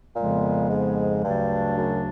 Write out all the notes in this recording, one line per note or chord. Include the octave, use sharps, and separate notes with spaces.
F2 A#2 C#3 F3 G#3 B3
G#2
D2 G2 C#3 F#3 A3 D4
F#2